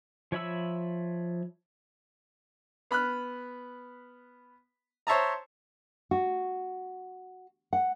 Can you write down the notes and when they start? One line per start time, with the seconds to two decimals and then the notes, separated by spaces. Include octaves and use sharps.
0.32 F3 C#5 E5 B5 E6
2.91 B3 B5 F6 F#6
5.07 C5 C#5 E5 A5 A#5
6.11 F#4
7.73 F#5